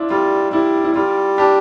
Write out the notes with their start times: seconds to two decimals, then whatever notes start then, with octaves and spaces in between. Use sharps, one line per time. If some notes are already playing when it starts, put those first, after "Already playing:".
Already playing: D4 E4 F4
0.10 G3 F4
0.53 G3 E4
0.84 E4
0.95 G3 F4
1.38 D4 G4